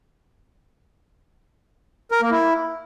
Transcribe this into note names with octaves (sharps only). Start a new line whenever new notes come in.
A#4
A#3
E4